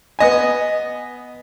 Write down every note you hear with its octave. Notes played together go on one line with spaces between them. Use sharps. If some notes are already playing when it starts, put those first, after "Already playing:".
B3 D#5 G#5